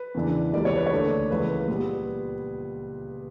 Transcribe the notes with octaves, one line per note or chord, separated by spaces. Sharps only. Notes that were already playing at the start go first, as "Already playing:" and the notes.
Already playing: B4
E2 C#3 E3 A#3 D4
C#2 C#3 E3 G3 A#3 D5
C#5
B4
C#5
D2 D3 A#3 D4
C#2 C#3 E3 A#3 B4
A#2 G3 B3